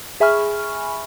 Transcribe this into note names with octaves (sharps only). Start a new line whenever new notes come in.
G#4 E5 G#5 B5 C#6 F6